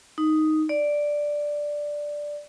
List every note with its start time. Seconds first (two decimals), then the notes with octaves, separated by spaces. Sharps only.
0.18 D#4
0.69 D5